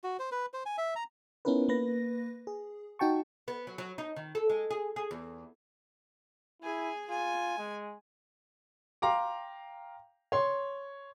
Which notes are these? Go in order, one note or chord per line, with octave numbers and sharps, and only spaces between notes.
F#4
C5
B4
C5
G#5
E5
A#5
B3 C#4 D#4 E4 A#4 B4
A#3 B4 A#6
G#4
D#4 F#4 G5 A5 C#6
B3
F#3
F#3
D#4
D#3
A4
G#3
G#4
G#4
E2
E4 G#4 G#5
F4 G#5
G#3
F5 G5 A#5 C6 D6
C#5 C6 C#6